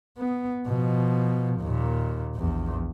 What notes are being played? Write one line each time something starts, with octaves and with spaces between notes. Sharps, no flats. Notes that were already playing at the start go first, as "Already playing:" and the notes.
B3
B2 F3
D#2 A#2
A#1 E2